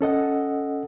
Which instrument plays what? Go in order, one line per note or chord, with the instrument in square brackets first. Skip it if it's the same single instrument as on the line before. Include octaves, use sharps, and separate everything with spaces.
[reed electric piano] C#4 A4 D#5 F#5